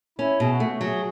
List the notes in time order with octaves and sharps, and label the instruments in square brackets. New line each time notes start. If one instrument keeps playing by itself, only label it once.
[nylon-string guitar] C#4 [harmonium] E4
[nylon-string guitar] B2 [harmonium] G#4
[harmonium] F#4
[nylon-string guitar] A3
[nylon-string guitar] F#3 [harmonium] G#4